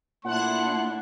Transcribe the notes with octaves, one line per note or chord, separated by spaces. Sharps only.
A#2 A3 D4 E4 F#5 C6 F#6